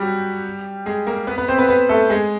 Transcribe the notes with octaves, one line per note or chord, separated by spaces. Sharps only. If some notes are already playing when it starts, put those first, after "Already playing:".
Already playing: F#3 G3 F#4 G4
G#3 G#4
A#3 A#4
B3 B4
B3 B4
C4 C5
B3 B4
B3 B4
A3 A4
G#3 G#4